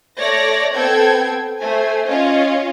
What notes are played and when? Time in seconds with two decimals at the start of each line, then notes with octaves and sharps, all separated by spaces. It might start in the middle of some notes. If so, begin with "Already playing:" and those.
0.19 A3 C#5 D5 A#6
0.75 B3 C4 A4 G5 G#6
1.59 A3 C5 G#5
2.08 C#4 F4 C#5 D#5